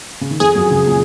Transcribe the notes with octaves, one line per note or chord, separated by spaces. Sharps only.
C#3
D#3
F2 F3 G#4
F#2 F#3
C#2 C#3
A#2